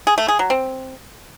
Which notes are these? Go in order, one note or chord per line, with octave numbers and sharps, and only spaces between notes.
G#4
A3
G#4
F#3
C4